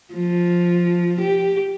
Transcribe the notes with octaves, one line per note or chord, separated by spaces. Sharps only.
F3
G4